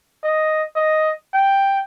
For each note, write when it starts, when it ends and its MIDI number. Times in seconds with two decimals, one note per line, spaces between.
0.24 0.64 75
0.76 1.12 75
1.34 1.81 79